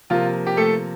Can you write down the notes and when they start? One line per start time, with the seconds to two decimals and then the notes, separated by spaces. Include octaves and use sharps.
0.10 C3 F3 A#3 F4
0.46 G4
0.57 A3 A4